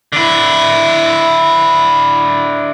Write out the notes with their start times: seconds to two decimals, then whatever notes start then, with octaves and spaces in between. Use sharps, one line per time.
0.13 D3 E4